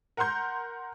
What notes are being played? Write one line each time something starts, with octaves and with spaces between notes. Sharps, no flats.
A#4 F#5 A#5 C6 G6